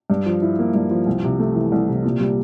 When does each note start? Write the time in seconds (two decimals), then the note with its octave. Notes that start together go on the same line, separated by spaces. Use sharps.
0.10 G2
0.26 F3
0.42 E4
0.59 A#3
0.74 G2
0.91 F3
1.06 C2
1.23 C3
1.39 A3
1.55 E3
1.72 C2
1.89 C3
2.05 A#2
2.20 G3